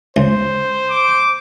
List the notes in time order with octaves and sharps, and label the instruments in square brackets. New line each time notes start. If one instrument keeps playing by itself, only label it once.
[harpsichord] C#2 [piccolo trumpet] C5
[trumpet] D6